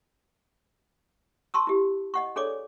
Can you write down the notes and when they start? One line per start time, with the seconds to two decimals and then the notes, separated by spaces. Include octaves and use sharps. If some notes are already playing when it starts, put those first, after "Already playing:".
1.54 A5 C6 C#6 E6
1.67 E4 G4
2.14 D#5 F#5 C#6
2.36 D4 G#4 A4 C#5 D5 D6